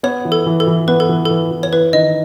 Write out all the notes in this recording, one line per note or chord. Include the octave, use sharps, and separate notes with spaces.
B3 C#5
E3
A4
E3
A4
E3
B3 B4
A4
E3
E3 A4
E3
C#5
E4 B4
D#3 D#5